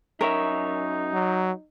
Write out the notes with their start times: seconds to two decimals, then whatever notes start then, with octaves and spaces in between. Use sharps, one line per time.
0.21 F#2 D#4 A#4 C#5 E5
1.14 F#3